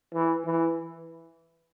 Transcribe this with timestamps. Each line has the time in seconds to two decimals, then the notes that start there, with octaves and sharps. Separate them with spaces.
0.14 E3
0.45 E3